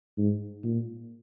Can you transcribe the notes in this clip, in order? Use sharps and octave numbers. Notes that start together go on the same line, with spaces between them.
G#2
A#2